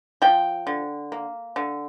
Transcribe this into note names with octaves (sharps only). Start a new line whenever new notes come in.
F3 G5
D3
A#3
D3